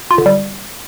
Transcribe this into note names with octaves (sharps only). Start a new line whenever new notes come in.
F4
D3
G3